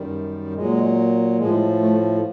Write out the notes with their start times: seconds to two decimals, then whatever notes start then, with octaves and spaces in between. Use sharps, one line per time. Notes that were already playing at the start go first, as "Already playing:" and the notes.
Already playing: F#2 D#3 G3
0.54 A#2 F#3 G#3
1.37 A2 F3 G#3
1.79 A3